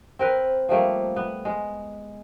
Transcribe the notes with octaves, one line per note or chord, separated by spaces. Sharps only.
C4 A#4 B4
F3 G3 A3 A#3
B3
G#3